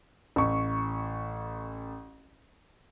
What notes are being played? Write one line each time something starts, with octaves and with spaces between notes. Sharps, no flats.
A1 C#6